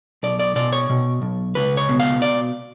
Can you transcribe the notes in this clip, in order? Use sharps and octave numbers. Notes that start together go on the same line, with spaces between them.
B1 D5
D5
B2 D5
C#5
B2
B1
C#2 B4
C#5
B2
F5
D5